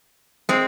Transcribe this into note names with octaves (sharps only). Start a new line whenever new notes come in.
G#3 C4